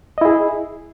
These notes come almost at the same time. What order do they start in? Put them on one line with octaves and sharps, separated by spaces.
D#5 E4 G#4